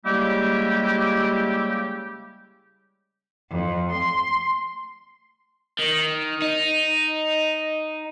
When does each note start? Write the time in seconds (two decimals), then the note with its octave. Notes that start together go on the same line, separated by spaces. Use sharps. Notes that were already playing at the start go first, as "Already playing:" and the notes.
0.05 C#3 G3 G#3 A#3 E4 G4
3.50 F2
3.91 C6
5.79 D#3
6.42 D#4